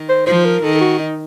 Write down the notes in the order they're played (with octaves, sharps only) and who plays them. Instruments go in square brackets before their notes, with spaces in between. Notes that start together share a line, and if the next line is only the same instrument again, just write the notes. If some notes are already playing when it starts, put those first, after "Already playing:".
Already playing: [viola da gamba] D#3
[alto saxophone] C5
[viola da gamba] F3 [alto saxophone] C5
[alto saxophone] A#4
[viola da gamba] D#3 [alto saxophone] A4
[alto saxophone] A4
F#4
D#4